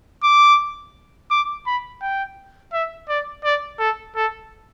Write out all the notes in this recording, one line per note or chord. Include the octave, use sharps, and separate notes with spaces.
D6
D6
B5
G5
E5
D5
D5
A4
A4